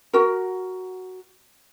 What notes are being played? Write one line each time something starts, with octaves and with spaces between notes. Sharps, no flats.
F#4 A#4